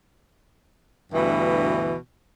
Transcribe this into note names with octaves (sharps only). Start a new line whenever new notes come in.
D2 G2 B2 E3